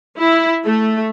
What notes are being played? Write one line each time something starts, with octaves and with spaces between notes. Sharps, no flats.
E4
A3